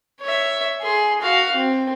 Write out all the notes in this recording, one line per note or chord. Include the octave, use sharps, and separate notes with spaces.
C#5 E5
G#4 C6
F#4 F5
C4